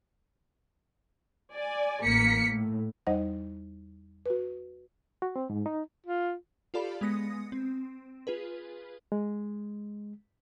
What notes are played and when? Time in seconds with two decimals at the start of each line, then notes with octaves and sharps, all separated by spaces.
1.53 D5 G#5
2.04 A1 A#3 B6 C#7
2.47 A2
3.07 E2 G3 D#4 C5 D#5 F#5
4.26 F#4 B4
5.22 F#4
5.36 C4
5.50 G#2
5.66 D#4
6.06 F4
6.74 F4 G4 A4 D5 F5 B5
7.01 G#3 B3 D#6 A#6 C#7
7.52 C4
8.27 F4 G#4 B4
9.12 G#3